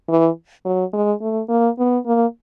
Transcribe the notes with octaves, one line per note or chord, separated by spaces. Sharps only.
E3
F#3
G#3
A3
A#3
B3
A#3